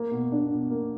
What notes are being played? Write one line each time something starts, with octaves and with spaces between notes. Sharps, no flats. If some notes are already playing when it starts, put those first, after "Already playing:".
Already playing: A#3
B2
D4
B2
A#3